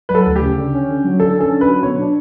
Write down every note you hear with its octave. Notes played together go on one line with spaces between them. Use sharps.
F#3 B4
A4
D2
G4
C#3
D3
C#4
D3
F#3
D3 A4
C#4
A4
D3
B4
F#3
B2 C#5
D4